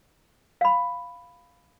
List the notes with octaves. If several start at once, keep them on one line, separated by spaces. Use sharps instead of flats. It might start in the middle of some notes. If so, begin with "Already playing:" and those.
F5 B5